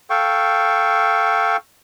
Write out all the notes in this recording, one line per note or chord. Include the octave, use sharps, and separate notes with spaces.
A4 F5 G5 C#6